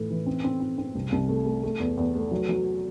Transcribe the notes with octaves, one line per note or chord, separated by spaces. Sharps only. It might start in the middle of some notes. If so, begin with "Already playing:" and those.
Already playing: A2 E3 A3
E3
C4
C4
C4
C4
C2
C2
A3
A3
A3
E2
E2
A3
F#3
F#3